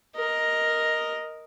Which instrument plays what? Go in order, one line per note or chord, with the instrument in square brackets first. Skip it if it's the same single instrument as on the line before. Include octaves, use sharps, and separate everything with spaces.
[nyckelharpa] A#4 D#5